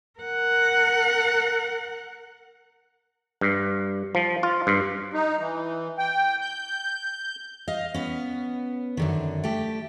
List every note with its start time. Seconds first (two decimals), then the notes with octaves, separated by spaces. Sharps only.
0.20 A#4 F#5
3.41 G2
4.15 F3
4.43 F4
4.67 G2
5.14 D#4
5.39 E3
5.98 G5
6.41 G6
7.68 D#5 F5
7.94 B3 C#4
8.97 F#2 D3 D#3
9.44 A3 G4